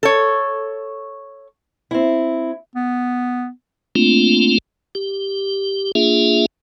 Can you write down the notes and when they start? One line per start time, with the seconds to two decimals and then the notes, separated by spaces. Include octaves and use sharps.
0.03 A4 C#5
1.91 C4 E4
2.75 B3
3.95 A3 A#3 C4 D4 F4
4.95 G4
5.95 A#3 D4 F4 G#4 E5